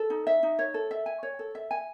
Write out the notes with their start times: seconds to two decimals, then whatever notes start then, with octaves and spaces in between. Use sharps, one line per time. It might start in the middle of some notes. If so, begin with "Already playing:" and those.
Already playing: A4
0.10 D#4
0.27 E5
0.43 D#4
0.59 C#5
0.74 A4
0.91 E5
1.06 G#5
1.23 C#5
1.39 A4
1.55 E5
1.71 G#5